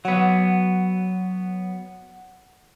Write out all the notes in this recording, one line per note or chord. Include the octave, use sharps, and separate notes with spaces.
F#3 B3 F#5